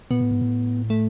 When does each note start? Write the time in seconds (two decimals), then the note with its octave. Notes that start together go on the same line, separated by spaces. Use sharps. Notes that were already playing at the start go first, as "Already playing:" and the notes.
0.11 A#2 B3
0.20 A2
0.31 G#2
0.41 A2
0.90 A3